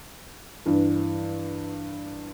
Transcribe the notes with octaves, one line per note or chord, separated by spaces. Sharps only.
G2 E3